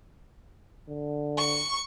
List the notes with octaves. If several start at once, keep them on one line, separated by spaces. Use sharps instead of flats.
D3
C#6